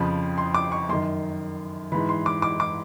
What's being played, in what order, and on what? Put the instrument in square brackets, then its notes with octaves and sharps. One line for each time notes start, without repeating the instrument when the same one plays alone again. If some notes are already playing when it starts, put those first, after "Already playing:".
Already playing: [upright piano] F2 C#3 F3 B5
C6
D6
C#6
F#2 D#3 C6
G#2 E3 B5
C6
D6
D6
D6